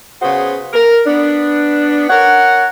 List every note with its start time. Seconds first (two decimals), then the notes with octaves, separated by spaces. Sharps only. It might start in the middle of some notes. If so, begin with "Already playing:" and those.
0.22 C#3 B3 F#4 G#4 C5
0.73 A#4
1.06 B3 D4
2.09 A#4 C#5 F#5